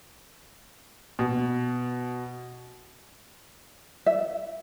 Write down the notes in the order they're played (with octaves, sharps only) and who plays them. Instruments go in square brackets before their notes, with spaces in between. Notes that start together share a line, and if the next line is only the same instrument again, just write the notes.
[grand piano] B2
[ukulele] E5